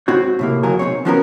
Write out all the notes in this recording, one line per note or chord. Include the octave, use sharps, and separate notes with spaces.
G#2 C4 F#4 C#5
A2 C3 A#3
C#2 F#2 F#3 F#4 G#4 A#4
B1 C3 C4 C#5
F3 B3 C#4 F#4 A4 A#4